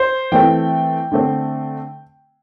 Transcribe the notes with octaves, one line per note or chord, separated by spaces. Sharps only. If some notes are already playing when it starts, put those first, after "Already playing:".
Already playing: C5
E3 A3 C4 G5
D3 A3 C4